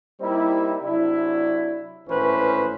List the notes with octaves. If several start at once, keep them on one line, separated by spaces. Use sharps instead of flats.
G3 A#3 C4 D#4 E4
C3 F#3 D4 E4
G#1 A2 E3 C#4 B4 C5